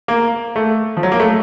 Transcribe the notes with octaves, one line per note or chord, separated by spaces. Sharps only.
A#3
A3
F3
F#3
A#3
A3